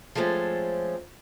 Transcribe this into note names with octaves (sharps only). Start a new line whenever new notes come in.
F3 G#3 A3 C4 C#4